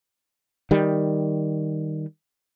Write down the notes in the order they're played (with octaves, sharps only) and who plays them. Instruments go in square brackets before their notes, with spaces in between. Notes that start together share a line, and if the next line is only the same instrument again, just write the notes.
[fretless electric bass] D#3 G3